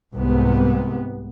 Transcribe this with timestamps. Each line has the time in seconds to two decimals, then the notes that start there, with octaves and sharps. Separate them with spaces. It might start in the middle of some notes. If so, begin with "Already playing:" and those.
0.16 C2 G#2 C3 B3